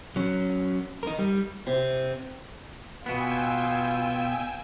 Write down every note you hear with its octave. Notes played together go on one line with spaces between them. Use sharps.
F#3 C#4
D#4 A#4
G3
C3
B2 B3 F4 G5 G#5 E6